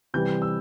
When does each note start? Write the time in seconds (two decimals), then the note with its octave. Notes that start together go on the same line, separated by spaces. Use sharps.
0.14 C3 E3 G3 G6
0.42 E6